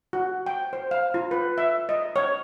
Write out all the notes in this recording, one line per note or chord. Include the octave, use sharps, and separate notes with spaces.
F#4
G5
C5
F5
F4
B4
E5
D#5
C#5